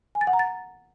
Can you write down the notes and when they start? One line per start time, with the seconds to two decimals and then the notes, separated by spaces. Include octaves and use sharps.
0.15 G#5
0.21 A6
0.27 F#5
0.33 A#5
0.39 A6